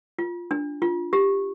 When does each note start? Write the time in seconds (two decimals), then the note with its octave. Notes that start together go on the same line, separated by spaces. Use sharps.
0.18 F4
0.51 D4
0.82 F4
1.13 G4